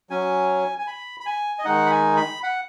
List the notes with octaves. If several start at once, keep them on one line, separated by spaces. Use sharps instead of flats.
F#3 C#4 G#5
G#5
B5
B5
G#5
D#5
D#3 G#3 D#4 F#5
B5
G#5
B5
F#5